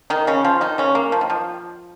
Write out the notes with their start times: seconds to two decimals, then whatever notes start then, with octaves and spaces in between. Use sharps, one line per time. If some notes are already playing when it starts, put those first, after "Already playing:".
0.10 D#3 D#4
0.27 C#3 C#4
0.45 F3 F4
0.61 D#3 D#4
0.78 C#3 C#4
0.95 A#3
1.12 F3
1.21 D#3
1.30 F3